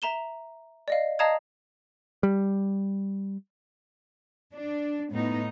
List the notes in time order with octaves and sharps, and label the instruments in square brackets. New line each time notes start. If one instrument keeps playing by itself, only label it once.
[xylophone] E5 A#5 E7 G7
D5 D#5 F5
D#5 F5 A5 A#5 D#6 G#6
[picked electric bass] G3
[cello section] D4
A2 B3 D#4